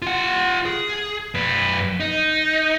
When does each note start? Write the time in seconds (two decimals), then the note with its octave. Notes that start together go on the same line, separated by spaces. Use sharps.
0.02 F4 F#5
0.65 G#4
1.34 F#2 B4
2.00 D#4